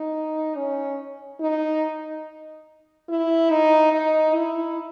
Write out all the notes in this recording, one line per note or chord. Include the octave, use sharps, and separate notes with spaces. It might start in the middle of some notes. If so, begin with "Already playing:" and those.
Already playing: D#4
C#4
D#4
E4
D#4
D#4
E4